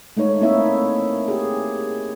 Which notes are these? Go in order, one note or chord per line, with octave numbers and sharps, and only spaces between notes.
G#3 A3 D#4 C#5
A#3 C4 D#4 E4 C#5 E5
G4 G#4